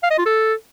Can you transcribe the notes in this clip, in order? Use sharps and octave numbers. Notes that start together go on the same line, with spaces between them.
F5
D#5
F4
A4